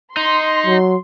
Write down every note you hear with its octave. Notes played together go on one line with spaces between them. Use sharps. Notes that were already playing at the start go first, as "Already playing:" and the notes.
D#4 C6
F#3